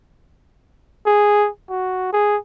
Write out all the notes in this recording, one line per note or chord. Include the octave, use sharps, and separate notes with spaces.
G#4
F#4
G#4